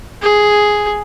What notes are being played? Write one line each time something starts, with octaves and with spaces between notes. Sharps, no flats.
G#4